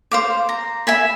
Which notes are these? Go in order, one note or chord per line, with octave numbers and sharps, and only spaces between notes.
C5 F5 D6
A#5
E5 G#5 B5